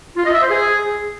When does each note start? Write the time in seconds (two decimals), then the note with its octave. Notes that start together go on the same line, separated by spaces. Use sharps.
0.16 F4
0.25 D#5
0.33 E5
0.41 C5
0.49 G#4